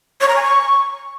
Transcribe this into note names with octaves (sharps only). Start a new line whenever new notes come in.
C#5
A#5
G#5
C#6